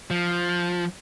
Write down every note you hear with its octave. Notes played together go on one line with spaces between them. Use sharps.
F3